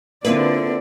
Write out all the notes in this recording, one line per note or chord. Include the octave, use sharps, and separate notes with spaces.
D3 A#3 C4 E4 F4 B4 D5